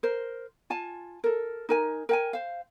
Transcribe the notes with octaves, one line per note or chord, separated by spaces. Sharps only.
A#4 C5
F4 G#5 A5
A4 A#4
D#4 A#4 G#5
A#4 G5 G#5
C5 F5